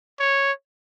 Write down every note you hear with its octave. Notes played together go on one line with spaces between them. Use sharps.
C#5